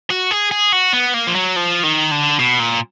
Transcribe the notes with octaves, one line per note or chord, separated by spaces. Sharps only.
F#4
G#4
G#4
F#4
B3
A#3
F3
F#3
F3
D#3
D3
B2
A#2